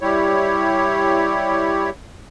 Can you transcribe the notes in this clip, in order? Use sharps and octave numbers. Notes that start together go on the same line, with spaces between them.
G3 E4 G4 C#5